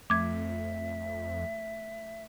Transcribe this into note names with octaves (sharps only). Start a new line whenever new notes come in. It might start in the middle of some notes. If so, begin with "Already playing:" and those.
F2 A3 E5 D6 G#6